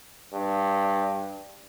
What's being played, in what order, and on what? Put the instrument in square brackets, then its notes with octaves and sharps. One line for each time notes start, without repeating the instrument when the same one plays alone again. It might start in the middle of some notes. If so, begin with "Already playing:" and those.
[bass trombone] G2